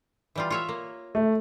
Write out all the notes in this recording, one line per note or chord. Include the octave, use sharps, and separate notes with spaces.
E3 G3 F4
F4 C#5 E5
A#3
A3